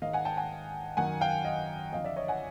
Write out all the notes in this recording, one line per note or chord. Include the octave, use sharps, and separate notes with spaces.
G#2 D#3 D#5 F5
F#5 G#5
G5 A5
F#5 G#5
F#2 D#3 F#5 G#5
F5 G5
D#5 F5
F2 D3 D#5 F5
D5 E5
C#5 D#5
F#5 G#5